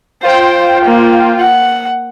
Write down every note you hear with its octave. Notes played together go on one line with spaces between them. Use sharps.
F4 C5 G5
A#3
F#5